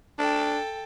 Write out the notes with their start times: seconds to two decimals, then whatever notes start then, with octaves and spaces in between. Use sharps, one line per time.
0.19 D4 A4 G5